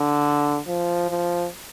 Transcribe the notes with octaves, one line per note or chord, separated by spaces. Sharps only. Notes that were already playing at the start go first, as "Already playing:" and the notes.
Already playing: D3
F3
F3